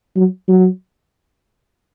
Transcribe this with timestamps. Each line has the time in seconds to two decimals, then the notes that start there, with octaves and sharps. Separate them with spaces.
0.16 F#3
0.48 F#3